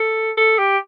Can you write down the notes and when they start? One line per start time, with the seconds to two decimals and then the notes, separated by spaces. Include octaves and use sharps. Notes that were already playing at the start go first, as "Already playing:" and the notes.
Already playing: A4
0.37 A4
0.58 G4